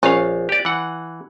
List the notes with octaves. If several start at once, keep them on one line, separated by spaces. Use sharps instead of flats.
A#1 C#4 F5
G4 D5
E3 F#5